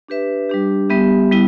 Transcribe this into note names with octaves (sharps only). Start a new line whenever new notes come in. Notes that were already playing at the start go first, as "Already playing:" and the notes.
D4 G4 B4 E5
G3 D4 G4
G3 B3 G4 E5
G3 B3 E4